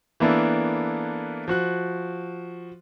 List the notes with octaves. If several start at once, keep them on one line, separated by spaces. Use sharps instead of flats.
E3 A#3 B3 D4 E4 A4
F3 F#4 F#6